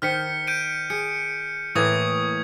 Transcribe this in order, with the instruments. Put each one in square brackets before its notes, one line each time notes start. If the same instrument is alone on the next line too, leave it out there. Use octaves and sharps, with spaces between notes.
[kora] D#3 C5 [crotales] F6 B6 C#7
[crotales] G6 D7 D#7
[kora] G#4 [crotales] C#7
[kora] A2 E3 A#3 [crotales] C#6 D#6 G#6